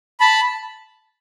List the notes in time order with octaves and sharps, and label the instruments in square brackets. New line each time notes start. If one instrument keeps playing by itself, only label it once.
[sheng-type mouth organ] A5 B5